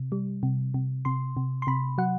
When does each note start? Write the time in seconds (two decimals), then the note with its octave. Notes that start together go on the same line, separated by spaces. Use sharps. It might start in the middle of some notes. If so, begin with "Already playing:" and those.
Already playing: C3
0.12 G3
0.43 C3
0.74 C3
1.05 C3 C6
1.37 C3
1.62 C6
1.67 C3 B5
1.98 F#3 F#5